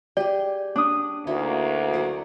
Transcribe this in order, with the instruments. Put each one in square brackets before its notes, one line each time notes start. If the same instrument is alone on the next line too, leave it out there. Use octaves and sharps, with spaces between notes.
[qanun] G4 G#4 [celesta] D5
[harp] D4 D#6
[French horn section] D2 A#3 [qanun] D#4 E4 F#4
[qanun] F#3 D5 F#5